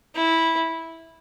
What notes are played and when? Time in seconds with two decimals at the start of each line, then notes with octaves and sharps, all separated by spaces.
0.15 E4